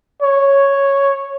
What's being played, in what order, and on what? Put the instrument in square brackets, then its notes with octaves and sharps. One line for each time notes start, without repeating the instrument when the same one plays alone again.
[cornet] C#5